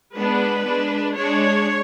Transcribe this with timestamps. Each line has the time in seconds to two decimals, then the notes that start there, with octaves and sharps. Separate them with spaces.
0.16 G#3 B3 D4 B4
0.65 G#3 D4
1.15 G#3 D4 C#5